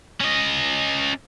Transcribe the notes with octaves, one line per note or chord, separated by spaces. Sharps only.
C#4 D#5